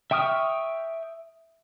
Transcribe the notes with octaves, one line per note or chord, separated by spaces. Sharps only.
E5 G5 C#6 D#6 F6